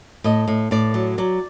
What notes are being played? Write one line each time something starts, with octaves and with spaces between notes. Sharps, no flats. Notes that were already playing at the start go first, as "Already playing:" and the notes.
A2 D#5
A2
A2 D5
F#3
F#3 D5